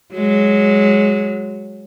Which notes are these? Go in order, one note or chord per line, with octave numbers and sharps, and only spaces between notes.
F#3 G#3